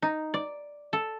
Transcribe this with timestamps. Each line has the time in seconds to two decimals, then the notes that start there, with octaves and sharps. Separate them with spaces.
0.02 D#4
0.34 D5
0.93 A4